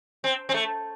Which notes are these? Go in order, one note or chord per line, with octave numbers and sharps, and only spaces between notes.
C4
C4
A3